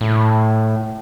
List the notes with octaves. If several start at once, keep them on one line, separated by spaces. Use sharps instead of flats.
A2